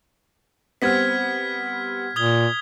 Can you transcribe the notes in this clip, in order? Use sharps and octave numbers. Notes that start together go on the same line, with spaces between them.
G3 B3 C4 F6 G#6 B6
A#2 D#6 G#6 G7